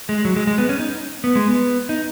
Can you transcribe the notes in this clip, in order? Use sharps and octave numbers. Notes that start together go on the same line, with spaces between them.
G#3
F#3
G#3
G#3
B3
C#4
D#4
B3
G#3
B3
D#4